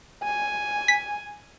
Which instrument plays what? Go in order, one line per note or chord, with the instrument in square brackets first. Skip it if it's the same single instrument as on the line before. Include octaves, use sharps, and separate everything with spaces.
[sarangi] G#5
[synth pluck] B6